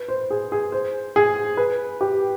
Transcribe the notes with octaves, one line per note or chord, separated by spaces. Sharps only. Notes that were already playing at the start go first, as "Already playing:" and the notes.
Already playing: B4
C5
G#4
G#4
C5
G#4
B4
G4